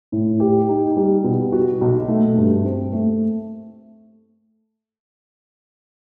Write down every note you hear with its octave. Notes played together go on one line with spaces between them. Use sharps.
A2
G4
D#4
G3
B2
F#4
B1
A3
G2
C4
A3